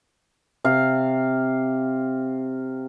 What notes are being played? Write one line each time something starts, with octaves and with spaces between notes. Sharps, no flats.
C3 F5